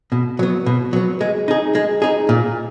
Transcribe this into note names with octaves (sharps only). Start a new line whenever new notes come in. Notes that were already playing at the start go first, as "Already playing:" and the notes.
B2
F#3 B3
B2
F#3 B3
G#3
D#4 G#4
G#3
D#4 G#4
A#2